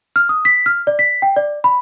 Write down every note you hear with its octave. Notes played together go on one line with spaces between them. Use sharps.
F6
D#6
B6
F6
D5
B6
G5
D5
B5